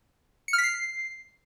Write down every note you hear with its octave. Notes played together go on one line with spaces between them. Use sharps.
C#7
F6
B6
C7